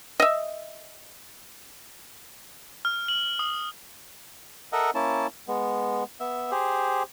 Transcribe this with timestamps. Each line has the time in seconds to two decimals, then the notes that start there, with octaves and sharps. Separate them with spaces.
0.20 D#5 E5
2.85 F6
3.08 F#7
3.39 D#6
4.73 A4 A#4 D#5 E5 F#5
4.95 A#3 C#4 E4 A5
5.48 G#3 B3
6.20 B3 E5
6.51 G4 G#4 C5